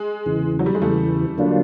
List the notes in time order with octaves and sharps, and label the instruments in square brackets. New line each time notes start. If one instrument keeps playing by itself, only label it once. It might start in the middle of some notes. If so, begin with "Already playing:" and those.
Already playing: [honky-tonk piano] G#3
[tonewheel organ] E2 C#3 E3
[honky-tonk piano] F#3
G3
G#3
[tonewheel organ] E2 C#3 E3 [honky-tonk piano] G3 A3
[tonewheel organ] D3 F#3 A#3 D4 F4